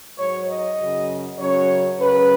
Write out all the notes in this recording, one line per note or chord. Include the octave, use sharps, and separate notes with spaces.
G#2 F#3 C#5
D#5
F#2 C#3 F#3
F#2 C#3 F#3 C#5
F#2 C#3 F#3 B4